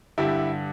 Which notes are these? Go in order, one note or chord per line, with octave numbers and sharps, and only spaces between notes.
G2 D3 E4 G4